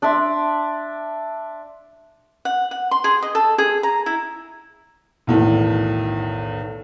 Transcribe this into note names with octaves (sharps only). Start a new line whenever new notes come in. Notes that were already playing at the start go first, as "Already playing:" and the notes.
D4 D5 E5 C6
F#5
F#5
C6
G#4
D#5
A4
G#4
A#5
E4
B1 E2 A2 D#3